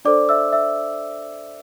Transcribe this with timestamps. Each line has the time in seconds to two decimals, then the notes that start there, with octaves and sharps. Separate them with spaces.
0.05 D4 A4 C5 D5 D6
0.29 E5 E6
0.52 E5 E6